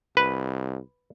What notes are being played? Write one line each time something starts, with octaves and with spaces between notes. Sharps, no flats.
C2 B4